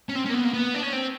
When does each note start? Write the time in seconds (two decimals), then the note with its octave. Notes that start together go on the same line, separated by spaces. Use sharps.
0.09 C#4
0.15 C4
0.26 C#4
0.30 A#3
0.34 B3
0.44 A#3
0.53 B3
0.75 D4
0.83 C#4
0.93 C4